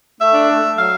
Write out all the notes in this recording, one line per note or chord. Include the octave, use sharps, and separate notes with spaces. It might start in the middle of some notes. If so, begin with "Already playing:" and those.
A3 E5
D4
A3
A3
F#3 F5